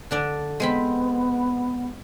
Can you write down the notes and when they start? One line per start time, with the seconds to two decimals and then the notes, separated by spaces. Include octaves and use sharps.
0.11 D3 D4 D5
0.60 G#3 B3 C4 B5